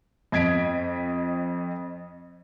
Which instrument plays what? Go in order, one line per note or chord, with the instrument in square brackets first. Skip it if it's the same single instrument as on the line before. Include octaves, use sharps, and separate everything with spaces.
[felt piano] F2 D#5 G#6 B6 D7